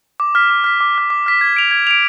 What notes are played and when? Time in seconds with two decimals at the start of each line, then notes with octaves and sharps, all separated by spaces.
0.20 D6
0.35 F6 B6
0.50 D6
0.64 F6 B6
0.80 D6
0.95 F6 B6
1.10 D6
1.26 F6 B6
1.41 G#6
1.56 D7 F7
1.71 G#6
1.87 D7 F7